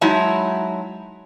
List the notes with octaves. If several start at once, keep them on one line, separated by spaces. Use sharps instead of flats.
F#3 G#3 D#4 E4 E5 A5